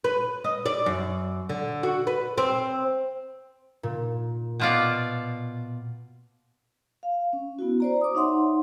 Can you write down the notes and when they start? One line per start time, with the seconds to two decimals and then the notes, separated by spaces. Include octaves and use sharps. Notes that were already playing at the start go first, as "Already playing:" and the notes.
0.04 B4
0.44 D#5
0.66 D5
0.86 F#2
1.49 D3
1.83 F#4
2.07 B4
2.38 C4
3.83 A#2
4.60 B2 F4 D5
7.03 F5
7.33 C#4
7.59 B3 E4 F#4
7.80 C5 D5 A#5
8.01 D6 D#6
8.15 D#4 C#5 E5 F#5 C6